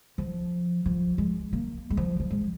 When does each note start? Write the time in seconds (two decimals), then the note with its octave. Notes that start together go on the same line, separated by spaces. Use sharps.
0.18 F3
0.86 F3
1.18 G#3
1.53 A#3
1.90 G#3
1.97 F3
2.20 F3
2.30 G#3